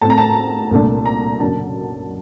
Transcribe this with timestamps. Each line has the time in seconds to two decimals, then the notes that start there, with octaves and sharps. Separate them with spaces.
0.01 A2 A3 C4 A5
0.10 A#5
0.18 A5
0.71 C2 A#2 A3 D4
1.06 A#5
1.40 F#1 F#2 F#3 A#3 D4 A5